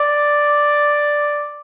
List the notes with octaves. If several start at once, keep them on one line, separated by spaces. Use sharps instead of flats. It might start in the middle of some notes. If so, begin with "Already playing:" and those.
Already playing: D5